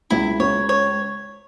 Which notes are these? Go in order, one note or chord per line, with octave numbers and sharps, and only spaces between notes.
C#2 E4
C#2 C#5
C#5